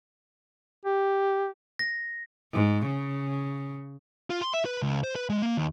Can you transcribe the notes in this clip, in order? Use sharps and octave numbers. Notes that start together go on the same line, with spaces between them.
G4
A#6
G#2
C#3
F4
C6
E5
B4
C#2
C5
B4
G#3
A#3
D#2